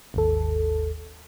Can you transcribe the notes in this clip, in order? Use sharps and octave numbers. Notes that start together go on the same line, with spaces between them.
G#1 D#2 A4